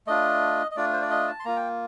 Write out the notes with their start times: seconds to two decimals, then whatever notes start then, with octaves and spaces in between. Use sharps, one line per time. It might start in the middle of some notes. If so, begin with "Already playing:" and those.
0.07 A3 D4 F4 D#5
0.71 D#5
0.76 A3 D4 F4 D5
0.93 C5
1.02 D5
1.10 D#5
1.27 A5
1.40 C6
1.45 A#3 F4 A#5
1.56 G5